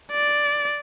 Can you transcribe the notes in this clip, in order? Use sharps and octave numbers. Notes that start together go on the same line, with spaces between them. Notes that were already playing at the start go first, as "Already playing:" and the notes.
D5